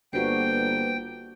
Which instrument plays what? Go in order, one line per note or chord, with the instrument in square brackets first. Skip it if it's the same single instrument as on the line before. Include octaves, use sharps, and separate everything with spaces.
[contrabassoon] G1 [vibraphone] A#3 B4 C5 [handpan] D4 F#4 G4 [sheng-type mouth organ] G5